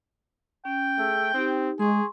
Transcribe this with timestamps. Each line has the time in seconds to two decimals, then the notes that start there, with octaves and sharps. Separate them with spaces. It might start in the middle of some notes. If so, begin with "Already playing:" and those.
0.65 C#4 G5
0.98 A3 G#4 E6
1.34 C4 D#4 G4
1.79 G#3 G#4 C6 C#6